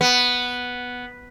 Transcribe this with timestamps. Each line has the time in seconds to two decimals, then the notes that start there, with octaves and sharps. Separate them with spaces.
0.01 B3